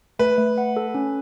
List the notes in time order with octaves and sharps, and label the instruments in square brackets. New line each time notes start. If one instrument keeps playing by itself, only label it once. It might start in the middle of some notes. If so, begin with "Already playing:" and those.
[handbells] A3 [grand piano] B4
[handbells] A3
F#5
A4
C#4